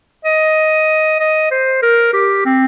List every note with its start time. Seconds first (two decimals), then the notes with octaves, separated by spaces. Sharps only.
0.25 D#5
1.20 D#5
1.51 C5
1.82 A#4
2.13 G4
2.46 C4